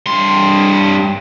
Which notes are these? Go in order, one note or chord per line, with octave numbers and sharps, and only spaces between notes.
G2 C6